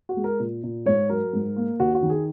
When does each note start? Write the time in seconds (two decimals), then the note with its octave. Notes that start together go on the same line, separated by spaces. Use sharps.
0.09 F#4
0.17 G#3
0.24 A#4
0.40 A#2
0.63 A#2
0.86 G#2 C#5
1.09 F#3 A#4
1.33 G#2
1.56 A#3
1.79 D#2 F#4
1.95 F#4
2.02 D#3
2.10 G#4